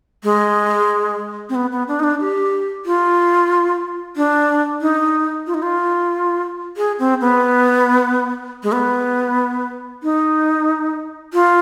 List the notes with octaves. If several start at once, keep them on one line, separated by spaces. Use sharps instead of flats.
G#3
C4
B3
B3
D4
D#4
D4
G4
F4
D4
D#4
F4
D#4
F4
G#4
C4
B3
G#3
B3
D#4
F4